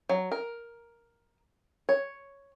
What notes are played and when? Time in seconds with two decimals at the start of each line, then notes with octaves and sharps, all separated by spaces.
0.09 F#3
0.32 A#4
1.89 C#5